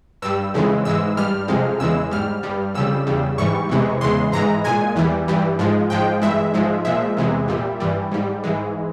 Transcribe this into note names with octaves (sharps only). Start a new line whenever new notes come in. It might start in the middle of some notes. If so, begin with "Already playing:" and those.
G2 G3 E6
F2 C#3 E3 G#3
G#2 E3 G#3 E6
G2 G3 F6
F2 C3 F3 G#3
E2 C#3 E3 G#3 E6
G#2 G3 F6
G2 G3
F2 C#3 G3 E6
E2 C#3 G3
G#2 E3 G3 C#6
E2 C3 E3 G#3
E2 C#3 E3 G#3 C6
G#2 E3 G#3 A#5
A#2 G#3 G#5
E2 E3 G3
G2 E3 G3
G#2 F3 G#3
G#2 F3 G#3 G5
G2 E3 G#3 E5
G#2 F3 G#3
A#2 F3 G#3 E5
E2 C3 E3 G#3
A#2 G3
G2 E3 G3
G#2 G3
G#2 E3 G#3